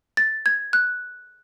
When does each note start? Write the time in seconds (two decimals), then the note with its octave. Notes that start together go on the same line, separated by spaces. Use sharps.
0.17 A6
0.46 G#6
0.73 F#6